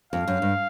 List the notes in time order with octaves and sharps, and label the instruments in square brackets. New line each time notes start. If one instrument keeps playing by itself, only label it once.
[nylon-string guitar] F2 [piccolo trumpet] F5
[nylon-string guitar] F#2
G2